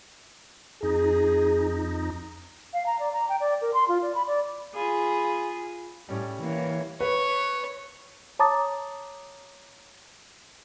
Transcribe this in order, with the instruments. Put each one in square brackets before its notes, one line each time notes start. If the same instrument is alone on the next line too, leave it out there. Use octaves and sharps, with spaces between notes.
[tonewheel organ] F2 D#4 [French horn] G#4
[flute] F5
A#5
D5
A#5
G5
D5
A#4
C6
F4
D5
B5
D5
[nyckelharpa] F4 B5 [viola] G#4
[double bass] A2 [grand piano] G3 C#4 G4
[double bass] E3 [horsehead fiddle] A#3 C#5
[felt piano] B4 [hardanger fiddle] C#5
[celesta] C#5 A5 A#5 D6 D#6 A6